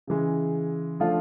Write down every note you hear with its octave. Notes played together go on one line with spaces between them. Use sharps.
C#3 E3 G#3
F3 A3 D4 F4